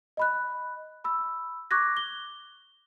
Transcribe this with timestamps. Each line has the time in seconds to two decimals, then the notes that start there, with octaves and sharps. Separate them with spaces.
0.17 D#5 B5 F#6
1.04 B5 E6
1.71 C#6 D6 F#6 G#6 A#6
1.97 G7